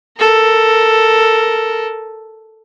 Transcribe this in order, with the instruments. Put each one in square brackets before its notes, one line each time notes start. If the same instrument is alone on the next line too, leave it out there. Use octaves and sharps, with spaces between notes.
[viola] A4 A#4